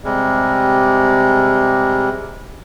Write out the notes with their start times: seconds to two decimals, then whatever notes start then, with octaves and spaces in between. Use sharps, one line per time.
0.04 C3 G3 G#3